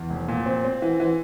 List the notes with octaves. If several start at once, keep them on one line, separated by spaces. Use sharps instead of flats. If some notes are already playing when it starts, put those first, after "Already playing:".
Already playing: E2
F1
A#2
C4
C4
E3
E3